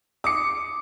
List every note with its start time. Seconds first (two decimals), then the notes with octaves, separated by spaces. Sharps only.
0.24 D6 D#6 C#7